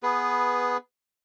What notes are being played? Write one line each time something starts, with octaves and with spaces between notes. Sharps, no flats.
B3 G#4 B4